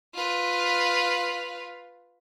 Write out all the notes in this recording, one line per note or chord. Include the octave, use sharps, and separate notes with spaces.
F4 B4